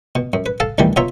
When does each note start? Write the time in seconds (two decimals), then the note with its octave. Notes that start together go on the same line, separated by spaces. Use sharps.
0.15 B2
0.33 F#2
0.46 B4
0.60 A4 F5 A5
0.78 D2 B2 D#3 E3 G3
0.96 B2 F4 C#5 E5 A#5